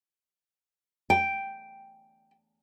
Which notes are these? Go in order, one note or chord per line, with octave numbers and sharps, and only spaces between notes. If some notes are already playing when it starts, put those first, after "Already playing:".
G5